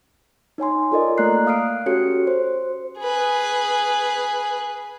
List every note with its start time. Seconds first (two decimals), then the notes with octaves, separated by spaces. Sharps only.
0.58 D#4 C#5 G#5 C6
0.92 F4 A4 A#4 D5 D#5
1.18 A3 A#3 D5 A#5 F#6 C7
1.47 F5 D#6 F6 F#6 C7 D7
1.86 C#4 F#4 G4 A4 C#5 C#7
2.27 C5
2.99 G#4 B4